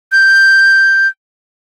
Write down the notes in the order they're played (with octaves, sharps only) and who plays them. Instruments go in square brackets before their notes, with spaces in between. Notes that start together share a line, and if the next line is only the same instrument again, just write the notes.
[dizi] G6